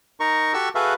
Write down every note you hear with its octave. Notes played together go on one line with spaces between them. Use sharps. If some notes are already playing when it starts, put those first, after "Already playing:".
D#4 A#4 C#6
F#4 G4 A4 C#6 E6
F#4 G#4 A4 B4 E5 F5